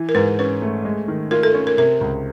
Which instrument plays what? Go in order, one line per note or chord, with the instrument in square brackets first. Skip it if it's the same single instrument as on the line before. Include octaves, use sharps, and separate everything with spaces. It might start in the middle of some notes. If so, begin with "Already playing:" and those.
Already playing: [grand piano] E3
[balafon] A#4
[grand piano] G#2 [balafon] B4
[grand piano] C#4 [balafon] B4
[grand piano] A3
G#3
D#3
[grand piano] F4 [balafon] A#4
[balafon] A4
[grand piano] C#4
[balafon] A#4
[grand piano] C3 [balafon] A#4
[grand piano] C#2